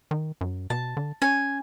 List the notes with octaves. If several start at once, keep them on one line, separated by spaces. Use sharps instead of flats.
D#3
F#2
B2 A5
D3
C#4 G#5